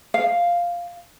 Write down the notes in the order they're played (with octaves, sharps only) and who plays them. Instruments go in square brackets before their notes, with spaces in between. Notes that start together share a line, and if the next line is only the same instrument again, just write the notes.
[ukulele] F5